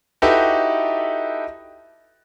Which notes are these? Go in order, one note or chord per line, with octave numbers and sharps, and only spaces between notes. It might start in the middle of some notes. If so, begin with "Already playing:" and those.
D#4 E4 F#4 G4 A4 B4